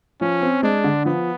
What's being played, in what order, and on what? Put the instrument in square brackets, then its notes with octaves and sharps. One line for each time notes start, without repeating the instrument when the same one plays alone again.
[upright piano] F3 [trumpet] C#4
[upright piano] C4
[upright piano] G#3 [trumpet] D4
[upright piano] D3
[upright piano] F3 [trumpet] B3